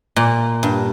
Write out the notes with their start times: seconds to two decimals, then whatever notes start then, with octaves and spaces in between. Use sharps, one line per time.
0.16 A#2
0.63 G2